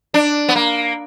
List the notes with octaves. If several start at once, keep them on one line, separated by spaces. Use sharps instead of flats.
D4
B3
A#3